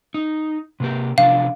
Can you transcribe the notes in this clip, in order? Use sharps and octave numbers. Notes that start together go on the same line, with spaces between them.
D#4
C3 A#3 G4
C3 F3 D4 F5